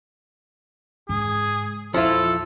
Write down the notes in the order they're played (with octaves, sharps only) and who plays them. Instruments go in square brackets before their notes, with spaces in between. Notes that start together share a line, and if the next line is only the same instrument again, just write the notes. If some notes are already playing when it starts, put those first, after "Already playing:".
[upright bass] G#2 C#3 [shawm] G#4
[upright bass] A#1 E2 [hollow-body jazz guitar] F3 E4 F4 [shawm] A4